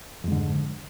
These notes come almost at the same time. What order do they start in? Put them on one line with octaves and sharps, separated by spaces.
F2 G#3 D3 G#2